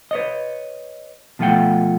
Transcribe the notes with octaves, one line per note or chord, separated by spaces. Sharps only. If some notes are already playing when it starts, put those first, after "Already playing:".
B4 C#5 D#5
B2 F3 A3 F4 F#5 G5